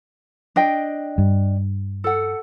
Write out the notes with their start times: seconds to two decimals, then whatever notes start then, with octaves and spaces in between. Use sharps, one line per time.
0.56 D4 D#5 G5
1.18 G2
2.04 A4 F#5